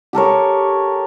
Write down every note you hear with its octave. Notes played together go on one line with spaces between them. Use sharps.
G4 A4 A#4 C#5